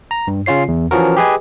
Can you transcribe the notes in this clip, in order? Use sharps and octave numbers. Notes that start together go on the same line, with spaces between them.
A#5
G2
C#3 C#4 F4 C#5 C7
E2
E3 F3 C#4 F#4 A#4
G4 G#4 B4 D#5 G#5